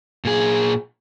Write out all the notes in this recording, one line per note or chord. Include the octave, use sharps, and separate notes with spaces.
A#2 G#4